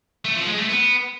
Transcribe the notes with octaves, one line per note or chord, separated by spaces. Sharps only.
A3
F3
G#3
A3
B3